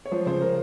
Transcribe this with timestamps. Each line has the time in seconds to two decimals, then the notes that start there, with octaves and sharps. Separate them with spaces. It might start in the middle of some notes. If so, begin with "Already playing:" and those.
0.05 C#5
0.11 F3 C5
0.26 C#3 C5
0.42 A#4